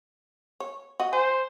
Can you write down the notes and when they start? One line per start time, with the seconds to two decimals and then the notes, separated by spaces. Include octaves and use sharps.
0.60 C#5
1.00 F#4 D#5
1.13 C5 G#5